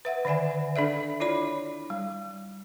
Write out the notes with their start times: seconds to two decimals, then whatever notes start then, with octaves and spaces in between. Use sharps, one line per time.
0.05 B4 E5 F#5
0.25 D3 D#3 D5 E5 G#5
0.76 D4 A4 D5 E5
1.20 E4 F4 C#5 D5 B5
1.90 G3